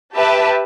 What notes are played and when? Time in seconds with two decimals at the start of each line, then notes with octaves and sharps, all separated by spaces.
0.15 G4 B4 E5 A5